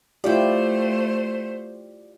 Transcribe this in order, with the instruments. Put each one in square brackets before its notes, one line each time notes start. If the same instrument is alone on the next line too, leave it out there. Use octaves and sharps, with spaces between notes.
[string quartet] A3 C5 [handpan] E4 F4 G4 [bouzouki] D5 G5